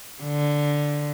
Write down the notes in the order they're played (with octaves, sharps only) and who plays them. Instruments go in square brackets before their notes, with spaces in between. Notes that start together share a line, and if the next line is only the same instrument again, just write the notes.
[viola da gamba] D3